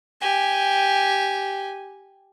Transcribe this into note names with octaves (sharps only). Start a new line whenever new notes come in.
G4 G#5